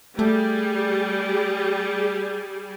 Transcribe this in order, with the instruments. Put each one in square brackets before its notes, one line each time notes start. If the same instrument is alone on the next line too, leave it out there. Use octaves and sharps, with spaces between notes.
[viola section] G3 G#4 [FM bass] A3